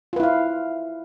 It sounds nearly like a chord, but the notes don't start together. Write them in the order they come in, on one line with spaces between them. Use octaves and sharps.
F4 B4 E4 F5